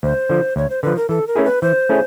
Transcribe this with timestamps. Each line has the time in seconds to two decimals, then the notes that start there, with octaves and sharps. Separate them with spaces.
0.03 D2 C5
0.30 D3 F3
0.56 D2 C#5
0.70 C5
0.83 D3 F3 B4
0.97 A#4
1.09 E3 A4
1.27 A#4
1.36 A3 C#4 E4 G#4
1.45 B4
1.62 E3 C5
1.89 A3 C#4 E4 G#4